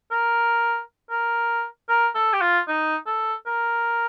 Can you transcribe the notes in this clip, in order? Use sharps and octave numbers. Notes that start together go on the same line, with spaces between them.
A#4
A#4
A#4
A4
G4
F4
D#4
A4
A#4